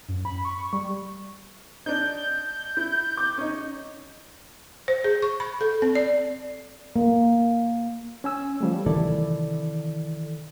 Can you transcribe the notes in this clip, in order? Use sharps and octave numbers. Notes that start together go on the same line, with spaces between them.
F#2
B5
C#6
G3
D4 D#4 G6
E4
D6
C#4 D#4
C5
G#4
C#6
B5
A4
C4
D5
A#3
C#4 G#5 E6
F3 G3 A3
C3 D#3 E3 E4 A4 D5